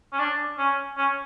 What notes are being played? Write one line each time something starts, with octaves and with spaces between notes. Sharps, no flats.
C#4
D4
C#4
C#4